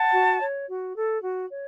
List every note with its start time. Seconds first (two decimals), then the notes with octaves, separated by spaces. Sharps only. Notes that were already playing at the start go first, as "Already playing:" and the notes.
Already playing: F#5 A5
0.13 F#4
0.40 C#5
0.68 F#4
0.95 A4
1.22 F#4
1.49 C#5